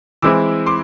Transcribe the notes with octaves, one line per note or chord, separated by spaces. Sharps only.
E3 G#3 C4 E4 D6 E6
C6 D6